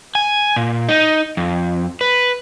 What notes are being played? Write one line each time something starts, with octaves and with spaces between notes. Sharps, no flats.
G#5
A#2
D#4
F2
B4